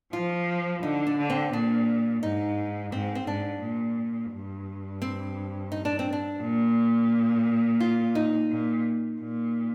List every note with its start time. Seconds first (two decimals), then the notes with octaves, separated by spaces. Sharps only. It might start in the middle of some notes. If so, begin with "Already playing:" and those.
0.13 F3 F4
0.83 D3 D#4
1.07 D4
1.18 D3
1.30 C4
1.53 A#2 D4
2.23 G#2 D#4
2.92 G#2 C4
3.15 C4
3.27 G#2 D4
3.62 A#2
4.32 G2
5.02 C4
5.72 D#4
5.85 D4
5.99 C4
6.13 D4
6.42 A#2
7.80 F4
8.15 D#4
8.50 A#2
9.20 A#2